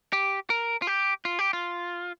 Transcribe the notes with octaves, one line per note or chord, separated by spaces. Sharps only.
G4
A#4
F4
G4
F4
G4
F4